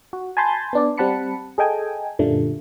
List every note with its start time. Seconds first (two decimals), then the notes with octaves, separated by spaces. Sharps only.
0.13 F#4
0.37 G#5 A5 B5 C6 G6 A6
0.73 B3 D4 D5
0.98 G3 C4 F#5 A5 B5 C#7
1.58 G#4 A4 D#5 G5 G#5
2.19 F#2 A#2 D3 G3 A3 A#3